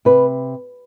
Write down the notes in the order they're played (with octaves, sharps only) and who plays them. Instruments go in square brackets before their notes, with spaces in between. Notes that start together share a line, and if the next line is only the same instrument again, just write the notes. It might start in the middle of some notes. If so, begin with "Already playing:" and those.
[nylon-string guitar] C3 B4